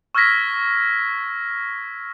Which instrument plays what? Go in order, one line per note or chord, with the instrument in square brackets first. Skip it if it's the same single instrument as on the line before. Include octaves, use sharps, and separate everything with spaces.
[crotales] C#6 E6 F6 G#6 A#6 B6